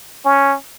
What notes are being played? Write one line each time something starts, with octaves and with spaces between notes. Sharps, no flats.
C#4